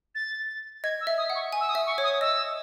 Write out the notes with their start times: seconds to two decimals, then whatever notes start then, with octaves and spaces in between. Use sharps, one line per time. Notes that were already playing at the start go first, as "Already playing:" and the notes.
0.15 A6
0.84 D#5 G#6
1.01 E6
1.07 E5
1.18 D#6
1.30 F#5
1.35 C#6
1.53 G#5
1.61 E6
1.69 D#6
1.75 E5
1.86 C#6
1.98 C#5
2.04 D#6
2.21 D#5 E6